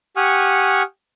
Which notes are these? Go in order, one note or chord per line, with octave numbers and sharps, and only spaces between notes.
G4 F#5 G#5 C#6 D#6 F6